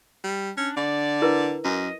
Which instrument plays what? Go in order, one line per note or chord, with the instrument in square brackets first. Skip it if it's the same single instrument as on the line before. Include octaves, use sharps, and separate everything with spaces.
[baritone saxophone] G3
[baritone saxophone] C#4 [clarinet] D4
[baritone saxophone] D3 [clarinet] D5
[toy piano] E4 A#4 B4
[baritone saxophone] F#2 [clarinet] D#5